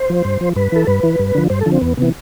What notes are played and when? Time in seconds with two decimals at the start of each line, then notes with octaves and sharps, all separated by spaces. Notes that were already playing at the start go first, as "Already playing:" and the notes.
Already playing: C5
0.10 F3
0.25 G2
0.41 F3
0.56 G2 B4
0.72 E3 A4
0.87 G2 B4
1.03 E3
1.19 G2
1.35 D3 F3
1.50 G2 C5
1.61 A4
1.66 D3 F3
1.72 C4
1.81 E2 B3
1.97 C3 E3 B3